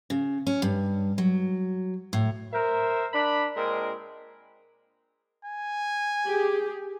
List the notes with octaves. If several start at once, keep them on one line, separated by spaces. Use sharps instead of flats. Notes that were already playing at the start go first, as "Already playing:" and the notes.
C#3
C#4
G2
F#3
A2
A#4 C5 E5
D4 B5
A#2 G#3 C4 A#4
G#5
G4 G#4